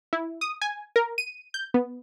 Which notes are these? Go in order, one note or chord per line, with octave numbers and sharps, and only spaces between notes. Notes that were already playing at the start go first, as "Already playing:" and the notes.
E4
D#6
G#5
A#4
D#7
G6
B3